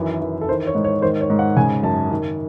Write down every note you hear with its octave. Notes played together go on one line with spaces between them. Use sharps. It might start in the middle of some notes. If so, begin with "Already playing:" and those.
Already playing: F#2 D#3 E3
E3
A4
D#3 C5
C#5
G#2
C#5
D#3 C5
C#5
G#2
F#5
C#3 G#5
F#2 A5
D#3